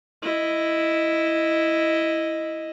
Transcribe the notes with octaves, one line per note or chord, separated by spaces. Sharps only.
E4 D#5